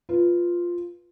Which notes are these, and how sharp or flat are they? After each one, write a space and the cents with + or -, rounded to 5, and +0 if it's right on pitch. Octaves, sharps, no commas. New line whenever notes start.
F4 +0 B4 +0